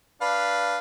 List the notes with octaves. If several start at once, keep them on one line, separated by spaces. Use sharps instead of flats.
D4 B4 F5